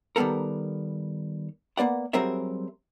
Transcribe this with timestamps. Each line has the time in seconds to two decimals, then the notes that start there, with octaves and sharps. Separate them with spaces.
0.16 D#3 G3 G#3 B3 A4 A#4
1.77 A#3 B3 D5 F#5
2.13 F#3 G3 C4 G#4 A#4 E5